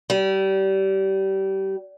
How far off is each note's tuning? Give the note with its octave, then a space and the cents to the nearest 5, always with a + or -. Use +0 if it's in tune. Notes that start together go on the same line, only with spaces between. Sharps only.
G3 -25